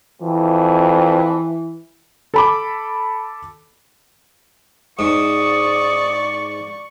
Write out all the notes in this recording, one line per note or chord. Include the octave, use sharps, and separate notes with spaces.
F2 E3
A4 B5 D6
G#2 D5 C#6 D#6